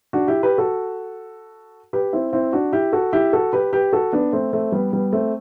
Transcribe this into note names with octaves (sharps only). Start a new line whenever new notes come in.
D4 F#4
E4 G4
G4 B4
F#4 A4
G4 B4
C4 E4
C4 E4
D4 F#4
E4 G4
F#4 A4
E4 G4
F#4 A4
G4 B4
G4 B4
F#4 A4
B3 D4
A3 C4
A3 C4
G3 B3
G3 B3
A3 C4